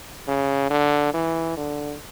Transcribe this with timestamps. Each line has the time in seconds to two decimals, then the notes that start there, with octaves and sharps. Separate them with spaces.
0.28 C#3
0.70 D3
1.13 E3
1.57 D3